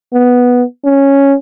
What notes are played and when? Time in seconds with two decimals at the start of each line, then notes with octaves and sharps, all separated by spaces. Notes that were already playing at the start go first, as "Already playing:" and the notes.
0.13 B3
0.85 C#4